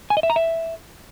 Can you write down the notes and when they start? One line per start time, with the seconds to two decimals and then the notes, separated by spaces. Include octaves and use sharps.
0.10 G#5
0.17 D#5
0.23 E5
0.30 A#5
0.36 E5